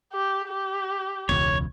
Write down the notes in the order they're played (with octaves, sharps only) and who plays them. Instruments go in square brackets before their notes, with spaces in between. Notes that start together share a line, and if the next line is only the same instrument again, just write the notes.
[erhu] G4
G4
[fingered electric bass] E1 C#2 [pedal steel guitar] C#5